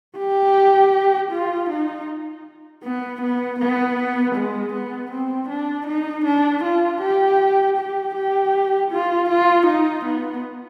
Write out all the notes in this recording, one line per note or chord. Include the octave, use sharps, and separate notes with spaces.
G4
F4
D#4
B3
B3
B3
G#3
B3
C4
D4
D#4
D4
F4
G4
G4
G4
F4
F4
D#4
B3